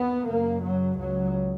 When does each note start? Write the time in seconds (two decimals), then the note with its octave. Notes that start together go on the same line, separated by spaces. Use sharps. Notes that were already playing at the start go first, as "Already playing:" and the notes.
Already playing: D#2 B3
0.26 F#2 C#3 A#3
0.62 F#3
0.98 C#2 C#3 F#3